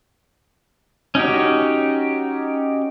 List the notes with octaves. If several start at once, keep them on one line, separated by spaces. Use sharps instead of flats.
C#4 D#4 F#4 G4